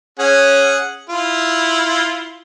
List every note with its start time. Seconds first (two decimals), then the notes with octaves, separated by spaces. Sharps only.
0.19 C#4 G#4 F#5
1.09 E4 F4